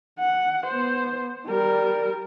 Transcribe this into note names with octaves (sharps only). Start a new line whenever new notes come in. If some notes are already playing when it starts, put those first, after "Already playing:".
F#5
B3 C5
G3 A#4